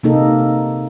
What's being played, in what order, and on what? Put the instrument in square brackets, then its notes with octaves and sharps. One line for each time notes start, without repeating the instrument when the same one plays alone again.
[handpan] C3 A#3 D#4 A4